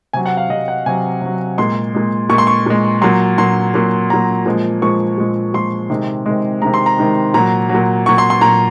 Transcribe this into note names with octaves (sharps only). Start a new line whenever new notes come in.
C3 F#3 G#5
F#5
F5
C3 F#3 D#5
F#5
C3 F#3 G#5
C3 F#3
A#2 G#3 C6
A#2 G#3
A#2 G#3 C#6
C6
C#6
A#2 G#3
A#2 F#3 C6
A#2 F#3 C6
A#2 F#3
A#2 F#3 A#5
A#2 F3 G#3
A#2 F3 G#3 C#6
A#2 F3 G#3
A#2 F3 G#3 C6
C3 D#3 G#3
C3 D#3 G#3
C3 D#3 G#3 A#5
C6
A#5
C3 D#3 G#3
A#2 F#3 A#5
F#3
A#2
A#2 F#3 C#6
C6
C6
A#2 F#3 A#5